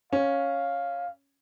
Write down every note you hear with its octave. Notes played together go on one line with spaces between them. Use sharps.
C#4 F5